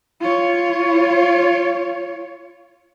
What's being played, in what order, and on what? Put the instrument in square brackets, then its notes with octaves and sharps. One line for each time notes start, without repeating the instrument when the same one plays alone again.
[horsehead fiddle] F4 C#5